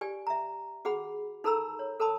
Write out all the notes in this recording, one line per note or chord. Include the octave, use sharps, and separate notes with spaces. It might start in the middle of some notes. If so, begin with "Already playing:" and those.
G4 D5 G#5
E5 A#5
F#4 G#4 F#5 B5
D#4 A4 A#4 A#5 B5 E6
C#5
A4 A#4 A5 B5 D#6